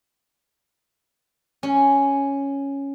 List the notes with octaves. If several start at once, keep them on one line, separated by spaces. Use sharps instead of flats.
C#4